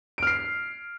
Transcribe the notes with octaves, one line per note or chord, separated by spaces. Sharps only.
F6 C7 D7